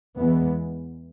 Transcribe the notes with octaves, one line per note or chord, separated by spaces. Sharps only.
E2 E3 G#3 B3